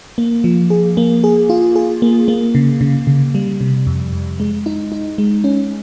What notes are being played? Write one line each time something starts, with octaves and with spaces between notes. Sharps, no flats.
A#3
F3
G#4
A#3
G#4
F4
G#4
A#3
A#3
C#3
C#3
C#3
G3
C3
F2
F2
G#3
D#4
D#4
G#3
C#4